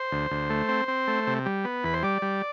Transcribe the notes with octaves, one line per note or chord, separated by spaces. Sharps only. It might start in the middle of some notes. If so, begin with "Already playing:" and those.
Already playing: C5
D2
D2
A3
C4
C4
A3
C3
G3
B3
E2 B4
C5
G3 D5
G3